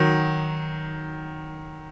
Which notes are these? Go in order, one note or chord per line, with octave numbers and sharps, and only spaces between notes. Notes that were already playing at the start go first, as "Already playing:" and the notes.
Already playing: D#3 F#3